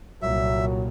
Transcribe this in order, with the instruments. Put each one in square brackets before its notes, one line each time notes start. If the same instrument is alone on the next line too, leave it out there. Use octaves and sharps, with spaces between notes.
[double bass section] C2 A#2 [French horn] F#3 [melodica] E5